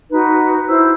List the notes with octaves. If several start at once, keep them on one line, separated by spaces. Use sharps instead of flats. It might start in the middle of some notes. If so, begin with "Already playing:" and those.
D#4 F#4 B4
E4 C5 E6